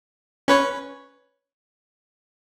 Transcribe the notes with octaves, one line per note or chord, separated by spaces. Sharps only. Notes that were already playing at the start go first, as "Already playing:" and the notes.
C#4 B4 C#5